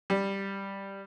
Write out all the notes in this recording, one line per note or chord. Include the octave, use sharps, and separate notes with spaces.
G3